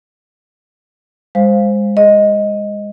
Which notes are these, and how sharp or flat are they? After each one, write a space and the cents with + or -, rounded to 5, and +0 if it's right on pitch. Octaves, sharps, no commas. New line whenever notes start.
G#3 -25 C5 +5 F5 +0
G#4 +0 D#5 +5